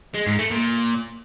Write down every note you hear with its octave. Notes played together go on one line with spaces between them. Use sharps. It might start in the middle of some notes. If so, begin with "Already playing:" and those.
G#3
G#2
A3
A#2